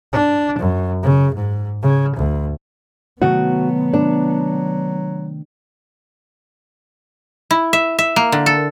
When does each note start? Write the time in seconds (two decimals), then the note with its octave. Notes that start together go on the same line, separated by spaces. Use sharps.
0.13 D4
0.58 F#2
1.03 C#3
1.35 G#2
1.82 C#3
2.16 D2
3.22 C3 D#3 F#3 A3 B3 F#4
3.94 D4
7.51 E4
7.73 E5
7.99 E5
8.16 A#3
8.32 D3
8.46 A4